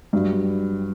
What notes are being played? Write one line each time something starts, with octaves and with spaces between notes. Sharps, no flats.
G2 F#3